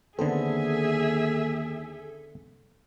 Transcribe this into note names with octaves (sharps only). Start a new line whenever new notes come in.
D#2 D3 B3 C4 G#4 A4 E5